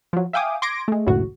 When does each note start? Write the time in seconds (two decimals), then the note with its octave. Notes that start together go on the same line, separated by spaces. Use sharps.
0.13 F3 F#3
0.33 E5 F5 G5 G#5 D6 D#6
0.62 C6 D6 G#6 A#6 D7
0.88 G#3 A3
1.06 G#1 C#2 F#2 A2 F#4